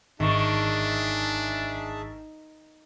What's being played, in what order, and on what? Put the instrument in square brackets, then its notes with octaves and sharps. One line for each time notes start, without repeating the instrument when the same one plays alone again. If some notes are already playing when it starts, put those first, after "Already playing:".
[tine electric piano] G#1 C#6 [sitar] D#3 [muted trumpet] D4 [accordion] G#4 E5 A5